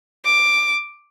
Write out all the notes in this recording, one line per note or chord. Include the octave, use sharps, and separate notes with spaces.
D6